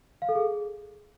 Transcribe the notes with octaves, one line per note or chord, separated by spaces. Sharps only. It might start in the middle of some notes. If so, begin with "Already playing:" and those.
F5
A4
G#4